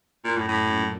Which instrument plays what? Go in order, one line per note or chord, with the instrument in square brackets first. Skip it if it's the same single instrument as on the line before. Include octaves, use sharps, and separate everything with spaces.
[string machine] F#2 [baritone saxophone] A#2
[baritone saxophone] A2
A2
[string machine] A#2